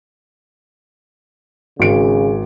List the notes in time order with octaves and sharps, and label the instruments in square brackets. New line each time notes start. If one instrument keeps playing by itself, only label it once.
[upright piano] G#1 D7 [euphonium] C#3